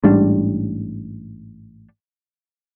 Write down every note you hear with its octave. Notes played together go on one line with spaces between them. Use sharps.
A1 G#2 G3 D4